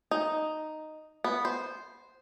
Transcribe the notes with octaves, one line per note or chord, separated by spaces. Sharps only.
D#4
B3
C5